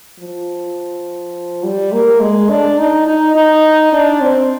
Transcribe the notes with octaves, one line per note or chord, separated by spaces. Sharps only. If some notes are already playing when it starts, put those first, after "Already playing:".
F3
G3
A#3
G#3
D4
D#4
D#4
D#4
D4
C4